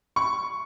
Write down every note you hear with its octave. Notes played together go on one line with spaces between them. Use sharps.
C#6